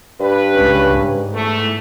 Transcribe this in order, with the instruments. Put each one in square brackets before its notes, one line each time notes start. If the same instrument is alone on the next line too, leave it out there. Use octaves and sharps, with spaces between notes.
[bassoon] G2 [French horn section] B4
[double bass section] C#2 C#4
G#2
[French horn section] E2 A3